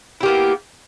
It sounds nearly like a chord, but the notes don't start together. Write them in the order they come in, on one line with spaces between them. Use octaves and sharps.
E4 G4 A#3 B3